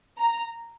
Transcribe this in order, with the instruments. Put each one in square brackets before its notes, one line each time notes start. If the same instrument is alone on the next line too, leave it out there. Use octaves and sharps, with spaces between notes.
[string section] A#5